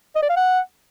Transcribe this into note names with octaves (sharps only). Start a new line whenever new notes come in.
D#5
D5
F5
F#5